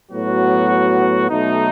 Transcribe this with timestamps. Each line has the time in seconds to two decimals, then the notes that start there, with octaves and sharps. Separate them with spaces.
0.11 A2 F#3 B3 F#4
1.29 B1 B2 A3 D#4